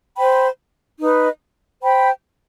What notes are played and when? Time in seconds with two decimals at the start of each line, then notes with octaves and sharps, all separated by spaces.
0.18 C5 G5 B5
0.99 D#4 B4 D#5
1.81 C5 G5 B5